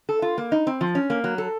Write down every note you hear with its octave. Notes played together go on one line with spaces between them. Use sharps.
A4
F4
A#3
D#4
C4
F3
C#4
A#3
F#3
A4